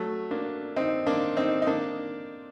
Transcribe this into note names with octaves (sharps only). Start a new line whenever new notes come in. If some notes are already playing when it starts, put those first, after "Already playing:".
Already playing: F#3 A3
A#3 D4
C4 D#4
A#3 D4
C4 D#4
D#4
A#3 D4